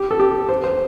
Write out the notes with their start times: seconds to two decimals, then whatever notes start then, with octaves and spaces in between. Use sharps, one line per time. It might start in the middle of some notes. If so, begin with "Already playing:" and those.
Already playing: G4
0.11 A4
0.20 G4
0.49 C5
0.64 C5